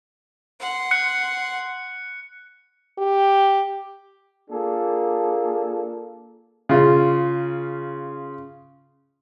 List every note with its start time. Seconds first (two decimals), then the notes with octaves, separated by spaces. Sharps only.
0.60 F#5 C6
0.91 F#6 C#7
2.98 G4
4.50 A#3 D4 F4 G#4 A4
6.69 C#3 F4